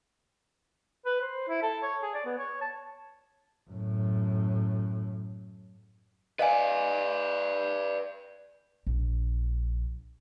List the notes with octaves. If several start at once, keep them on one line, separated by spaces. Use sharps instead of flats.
B4
C5
E4
A4
C#5
G#4
D5
B3
C#5
A5
F#2 A2
B4 D5 D#5 F5 G#5
A#1